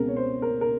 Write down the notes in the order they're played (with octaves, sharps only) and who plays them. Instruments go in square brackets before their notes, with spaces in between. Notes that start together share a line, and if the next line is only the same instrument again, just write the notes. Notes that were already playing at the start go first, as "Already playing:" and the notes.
Already playing: [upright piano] C#2 B2 G#3 C4 A#4
C#5
C5
A#4
A#4